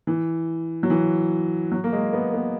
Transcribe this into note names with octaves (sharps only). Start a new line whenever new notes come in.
E3
F#3
E3
F#3
A#3
G#3
B3
B3